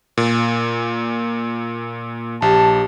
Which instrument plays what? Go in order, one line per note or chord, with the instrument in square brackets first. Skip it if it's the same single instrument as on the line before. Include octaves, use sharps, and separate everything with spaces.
[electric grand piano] A#2
[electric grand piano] A#1 [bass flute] G4 [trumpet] A5